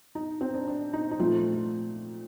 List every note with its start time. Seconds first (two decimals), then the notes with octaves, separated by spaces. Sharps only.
0.15 D#4
0.41 C4
0.54 D4
0.67 D4
0.93 D#4
1.11 D#4
1.19 A#2 F3 A3 C4 F4
1.54 F4